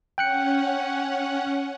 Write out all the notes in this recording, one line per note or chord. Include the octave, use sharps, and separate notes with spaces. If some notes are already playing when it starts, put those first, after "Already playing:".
C#4 F#5 G5 F#6 C#7